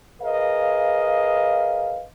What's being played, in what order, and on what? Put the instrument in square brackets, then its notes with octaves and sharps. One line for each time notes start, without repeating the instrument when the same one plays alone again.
[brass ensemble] G#4 A#4 B4 D#5 F5